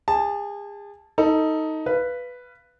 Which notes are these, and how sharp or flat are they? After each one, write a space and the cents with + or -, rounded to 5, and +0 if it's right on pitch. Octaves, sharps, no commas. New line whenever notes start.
G#4 -35 A5 -5
D#4 +15 A4 +20
B4 +0 F5 -25